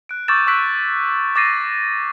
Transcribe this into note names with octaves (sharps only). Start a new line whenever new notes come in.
F#6 D7
C#6 D6 E6 G6 A6 E7
C#6 E6 F#6 B6 D7
D6 E6 A6 A#6 C7 D#7